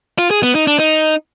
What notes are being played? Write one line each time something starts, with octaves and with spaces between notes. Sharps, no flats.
F4
G#4
B3
D#4
D4
D#4